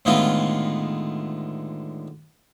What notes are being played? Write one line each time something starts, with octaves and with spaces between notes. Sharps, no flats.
A2 D3 D#3 G#3 B3 F4